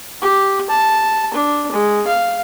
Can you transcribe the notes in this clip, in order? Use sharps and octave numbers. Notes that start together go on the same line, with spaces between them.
G4
A5
D4
G#3
F5